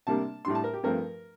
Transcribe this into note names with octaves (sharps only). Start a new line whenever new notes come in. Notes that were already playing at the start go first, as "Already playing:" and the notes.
C3 G3 A#3 D4 A5
A2 G3 D4 C6
A5
A#4
G4
G2 F3 A3 C4 A#4